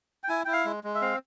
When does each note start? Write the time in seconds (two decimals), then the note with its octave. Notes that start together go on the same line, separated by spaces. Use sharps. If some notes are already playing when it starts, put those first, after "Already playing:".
0.24 G5
0.29 E4 G#5
0.45 E4 G5
0.53 F5
0.65 G#3
0.84 G#3
0.95 E5
1.01 C4 F5